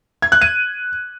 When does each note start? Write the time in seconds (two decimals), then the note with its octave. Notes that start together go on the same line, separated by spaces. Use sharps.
0.22 G#6
0.32 F#6
0.41 D#7